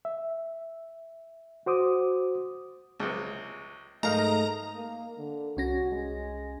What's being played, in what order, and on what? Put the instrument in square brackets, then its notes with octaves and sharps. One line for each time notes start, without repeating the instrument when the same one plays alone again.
[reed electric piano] E5
F#4 C5 D6 D#6
[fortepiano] C#2 C3
[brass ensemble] G#2 D#5 [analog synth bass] A3 [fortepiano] D#4 A#4 F5 [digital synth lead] A#5
[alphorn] A#3
D3
[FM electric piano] C2 C#4 A#6 [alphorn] F#4
[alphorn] G#3